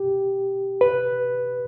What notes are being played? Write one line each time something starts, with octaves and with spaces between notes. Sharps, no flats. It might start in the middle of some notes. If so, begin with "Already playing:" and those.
Already playing: G4
B4